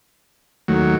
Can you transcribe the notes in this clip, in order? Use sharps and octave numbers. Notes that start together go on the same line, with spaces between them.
D#2 F#3 A3